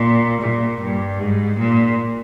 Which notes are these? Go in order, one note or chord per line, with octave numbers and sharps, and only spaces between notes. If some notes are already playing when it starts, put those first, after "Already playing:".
Already playing: A#2
A#2
G2
G#2
A#2